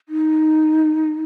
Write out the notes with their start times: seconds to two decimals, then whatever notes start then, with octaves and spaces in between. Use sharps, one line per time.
0.09 D#4